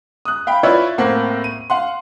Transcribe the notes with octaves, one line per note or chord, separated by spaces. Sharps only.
D#6 F#6
F5 G5 B5
E4 F4 B4 C#5 D5
A2 A#3 C4 F#5
D#7
F5 F#5 C6